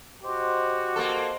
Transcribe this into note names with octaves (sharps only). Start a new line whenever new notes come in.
F#4 G4 C5 D#5 C6
A#3 A4